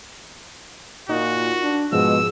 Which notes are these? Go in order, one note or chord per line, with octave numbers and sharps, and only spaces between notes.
A#2 D#4 F4 F#4
D4
G#2 B2 F3 G#3 E6